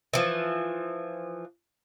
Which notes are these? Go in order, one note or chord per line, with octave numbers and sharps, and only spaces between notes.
E3 F3